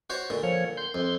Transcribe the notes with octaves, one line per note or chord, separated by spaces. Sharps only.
F#4 C5 C#5
A#2 D3
F3 C#5
C6 G6
F2